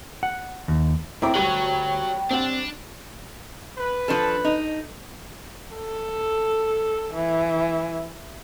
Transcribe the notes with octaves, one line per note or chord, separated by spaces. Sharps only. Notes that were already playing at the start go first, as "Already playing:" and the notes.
F#5
D#2
A2 C4 E4 D5 G5 A#5 D6
D2 F#3 G3 C#5 D#7
C4 D4 F#5
B4
F3 D4 A4
D#4
A4
E3